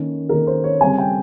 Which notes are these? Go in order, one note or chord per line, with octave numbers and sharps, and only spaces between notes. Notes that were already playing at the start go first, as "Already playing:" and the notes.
Already playing: D#3 A#3 C#4 C#5
D#3 A#3 C#4 A#4
C5
C#5
C#3 G3 C4 G#5
G5